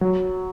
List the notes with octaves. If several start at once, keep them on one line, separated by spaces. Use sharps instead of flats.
F#3